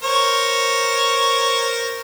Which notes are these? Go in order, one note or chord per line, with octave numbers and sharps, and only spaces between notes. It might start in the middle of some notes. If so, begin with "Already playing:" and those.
A#4 C5 C#5